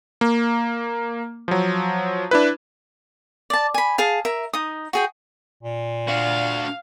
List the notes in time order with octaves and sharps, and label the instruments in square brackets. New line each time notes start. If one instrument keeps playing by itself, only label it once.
[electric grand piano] A#3
F3 F#3
D4 E4 B4
[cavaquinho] D5 A5
G#5 B5
G#4 F5 A5
A#4 E5
D#4 D#6
F#4 G#4 G5
[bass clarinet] A#2
[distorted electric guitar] D4 F#4 [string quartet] F5